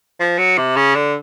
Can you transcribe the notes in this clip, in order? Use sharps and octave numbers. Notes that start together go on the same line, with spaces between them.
F3
F#3
C3
C#3
D3